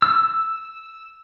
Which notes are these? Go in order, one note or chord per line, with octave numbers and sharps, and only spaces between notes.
E6